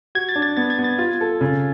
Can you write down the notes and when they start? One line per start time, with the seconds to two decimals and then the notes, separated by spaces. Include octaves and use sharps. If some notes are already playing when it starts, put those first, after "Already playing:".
0.15 F#4 G#6
0.29 A6
0.36 D4
0.42 A6
0.57 B3 A6
0.70 G#6
0.79 B3
0.84 A6
0.98 F4
1.21 A4
1.41 C#3